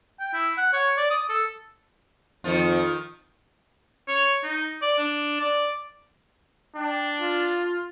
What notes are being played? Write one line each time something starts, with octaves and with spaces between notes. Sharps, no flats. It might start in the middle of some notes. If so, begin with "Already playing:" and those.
G5
E4
F#5
C#5
D5
D#6
A4
F2 D#3 F3 F4
C#5
D#4
D5
D4
D5
D4 G5
F4